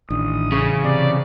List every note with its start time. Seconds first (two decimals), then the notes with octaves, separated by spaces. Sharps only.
0.10 A1 D#3 E3 D4 D#6
0.52 C#3 E3 G#4 C#6
0.84 C3 D5